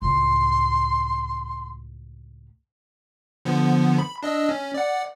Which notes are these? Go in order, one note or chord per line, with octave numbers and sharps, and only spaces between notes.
C#2 A2 C6
D3 F3 B3
B5
D4 D#5 E6
C#4
D5 F#5